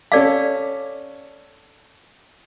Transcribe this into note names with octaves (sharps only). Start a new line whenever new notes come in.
C#4 A4 D5 F5 D6